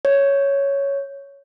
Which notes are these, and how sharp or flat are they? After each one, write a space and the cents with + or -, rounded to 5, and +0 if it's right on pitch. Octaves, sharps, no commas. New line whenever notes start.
C#5 +5